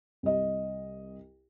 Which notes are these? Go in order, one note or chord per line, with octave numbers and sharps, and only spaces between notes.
C2 D#5